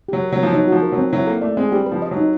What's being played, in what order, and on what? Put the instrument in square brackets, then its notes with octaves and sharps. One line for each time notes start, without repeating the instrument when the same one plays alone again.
[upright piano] F#3 [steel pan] G4
[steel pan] A#4
[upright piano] F#3 [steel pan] B3
[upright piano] F3
[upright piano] F#3 [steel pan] D#4
[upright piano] F3 [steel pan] F#4
[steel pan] A#4
[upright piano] F#3
[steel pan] C4
[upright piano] F#3 [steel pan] E4
[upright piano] A#3 [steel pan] A4
[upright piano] A3 [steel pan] D5
[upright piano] G#3 [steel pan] C4
[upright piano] G3 [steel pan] G4
[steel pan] B4
[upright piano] F3
[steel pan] D#5
[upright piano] F#3
[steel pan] D#4